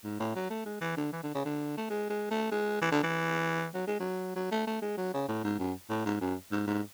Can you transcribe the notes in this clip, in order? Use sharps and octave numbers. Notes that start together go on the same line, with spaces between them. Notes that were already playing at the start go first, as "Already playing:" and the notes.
G#2
A2
F#3
A3
G#3
E3
D3
E3
D3
C#3
D3
A3
G#3
G#3
A3
G#3
E3
D3
E3
F#3
G#3
F#3
F#3
A3
A3
G#3
F#3
C#3
A2
G#2
F#2
A2
G#2
F#2
G#2
G#2